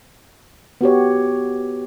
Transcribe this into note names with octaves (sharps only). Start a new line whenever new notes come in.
B3 F#4 G4 C#5